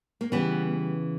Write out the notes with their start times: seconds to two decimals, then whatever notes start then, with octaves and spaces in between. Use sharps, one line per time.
0.21 A#3
0.32 C#3 E3 G3 B3